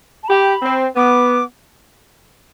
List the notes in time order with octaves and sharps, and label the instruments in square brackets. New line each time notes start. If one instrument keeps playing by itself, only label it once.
[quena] A5
[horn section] G4 [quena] B5
[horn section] C4
[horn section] B3 [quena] D6